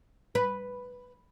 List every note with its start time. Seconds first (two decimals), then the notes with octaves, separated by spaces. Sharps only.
0.35 B4